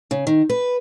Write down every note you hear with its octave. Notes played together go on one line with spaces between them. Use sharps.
C#3
D#3
B4